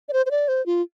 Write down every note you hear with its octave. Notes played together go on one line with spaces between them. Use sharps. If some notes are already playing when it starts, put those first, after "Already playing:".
D5
C5
C5
D5
C5
F4